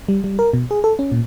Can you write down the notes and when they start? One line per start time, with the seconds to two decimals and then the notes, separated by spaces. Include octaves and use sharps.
0.09 G3
0.24 G3
0.39 A#4
0.53 B2
0.71 G#4
0.84 A4
0.99 C#4
1.12 A#2